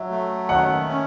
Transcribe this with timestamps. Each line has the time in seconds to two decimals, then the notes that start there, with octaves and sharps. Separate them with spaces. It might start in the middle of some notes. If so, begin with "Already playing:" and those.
Already playing: F#3 E5
0.10 A3
0.49 D#3 F#5
0.88 C#4